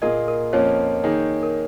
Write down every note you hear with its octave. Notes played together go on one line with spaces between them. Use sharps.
A#2 A#3 F4 G#4 A#4 D#5
A#4
F2 F3 A#3 C#4 F4 C#5
D#3 A#3 D#4 G#4
A#4